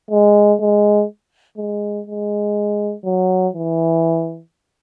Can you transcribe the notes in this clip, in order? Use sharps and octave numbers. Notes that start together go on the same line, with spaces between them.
G#3
G#3
G#3
G#3
F#3
E3